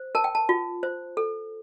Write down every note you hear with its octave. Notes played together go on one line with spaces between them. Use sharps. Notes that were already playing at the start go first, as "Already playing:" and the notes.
Already playing: C5
A#4 A5
G5
A5
F4
C5
A4